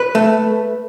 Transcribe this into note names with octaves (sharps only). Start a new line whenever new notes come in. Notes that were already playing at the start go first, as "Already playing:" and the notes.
Already playing: B4
A3